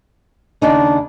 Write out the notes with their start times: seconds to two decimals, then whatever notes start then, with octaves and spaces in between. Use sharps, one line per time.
0.62 D#2 C#3 D4 D#4